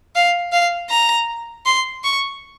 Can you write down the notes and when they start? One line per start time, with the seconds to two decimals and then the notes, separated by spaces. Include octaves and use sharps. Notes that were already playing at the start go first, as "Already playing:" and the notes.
0.15 F5
0.52 F5
0.90 A#5
1.66 C6
2.03 C#6